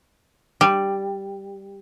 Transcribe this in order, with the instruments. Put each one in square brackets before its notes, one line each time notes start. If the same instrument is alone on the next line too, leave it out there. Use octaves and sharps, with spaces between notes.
[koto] G3